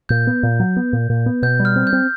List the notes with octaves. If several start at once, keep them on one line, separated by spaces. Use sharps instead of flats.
A#2 G6
B3
A#2
F#3
B3
A#2
A#2
B3
B2 G6
G3
F6
C4
G6
C4